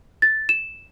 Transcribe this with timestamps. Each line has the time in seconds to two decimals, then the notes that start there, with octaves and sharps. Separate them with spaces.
0.22 A6
0.49 E7